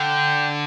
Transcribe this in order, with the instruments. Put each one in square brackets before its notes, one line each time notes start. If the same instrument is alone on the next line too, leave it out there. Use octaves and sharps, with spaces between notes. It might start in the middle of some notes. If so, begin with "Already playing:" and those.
Already playing: [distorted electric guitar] D3 [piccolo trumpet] G5